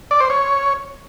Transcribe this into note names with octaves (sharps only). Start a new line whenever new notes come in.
D5
C5
C#5